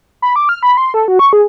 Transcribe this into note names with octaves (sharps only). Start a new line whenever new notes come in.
B5
D6
F6
B5
C6
A4
F#4
C#6
G#4